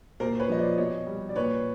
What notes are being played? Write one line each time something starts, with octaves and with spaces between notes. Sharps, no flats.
A#2 A#4 C5
C5
B4 C#5
F3 D#5
C5 D5
B2 C#5 D#5
G3
D5
A#2 B4 C#5